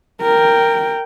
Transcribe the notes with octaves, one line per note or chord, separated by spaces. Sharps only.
A#4 G5